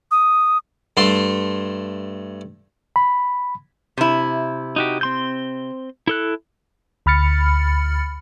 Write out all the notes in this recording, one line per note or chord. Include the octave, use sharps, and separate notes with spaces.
D#6
G2 A3 C6
B5
C3 E4
D#4 F#4 G4
C4 C6 G6
E4 A4 F#6
D2 B5 F6 A6 C#7